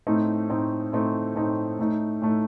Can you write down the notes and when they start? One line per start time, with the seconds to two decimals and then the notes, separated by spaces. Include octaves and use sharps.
0.07 A2 A3 C4 D#4
0.49 A2 A3 C4 D#4
0.92 A2 A3 C4 D#4
1.35 A2 A3 C4 D#4
1.78 A2 A3 D#4
2.22 A2 A3 D#4